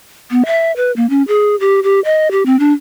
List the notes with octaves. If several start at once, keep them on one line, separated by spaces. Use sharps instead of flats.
B3
E5
B4
A#3
C#4
G#4
G4
G4
D#5
G4
C4
D4